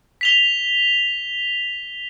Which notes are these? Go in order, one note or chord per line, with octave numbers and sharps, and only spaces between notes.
B6 F7 G7